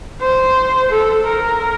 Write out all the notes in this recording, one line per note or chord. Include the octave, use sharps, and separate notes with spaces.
C5
A4
A#4